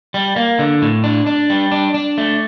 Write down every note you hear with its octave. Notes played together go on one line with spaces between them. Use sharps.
G3
A#3
D3
A2
D4
D4
G3
D4
D4
A3